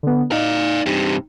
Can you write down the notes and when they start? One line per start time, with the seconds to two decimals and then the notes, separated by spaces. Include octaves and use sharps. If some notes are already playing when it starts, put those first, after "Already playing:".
0.03 D3 B3
0.32 D#4 D5 F5
0.86 G2 C3